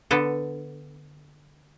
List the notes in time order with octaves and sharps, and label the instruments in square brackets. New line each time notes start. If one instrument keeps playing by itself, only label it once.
[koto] D3 B3 A4